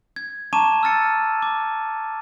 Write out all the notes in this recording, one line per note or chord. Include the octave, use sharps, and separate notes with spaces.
G#6
A5 A#5 C#6 D6 D#7 E7
E6 F6 A6 C#7
D6